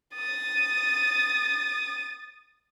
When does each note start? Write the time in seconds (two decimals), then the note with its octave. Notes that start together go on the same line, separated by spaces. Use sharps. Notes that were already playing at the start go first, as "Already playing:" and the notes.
0.15 D#6 A6